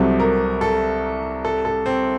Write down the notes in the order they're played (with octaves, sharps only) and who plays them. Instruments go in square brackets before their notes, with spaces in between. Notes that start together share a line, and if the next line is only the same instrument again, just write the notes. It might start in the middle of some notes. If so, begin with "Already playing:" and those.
Already playing: [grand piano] C2 C3 F#3 [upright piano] A4
[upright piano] A#4
A4
A4
A4
C4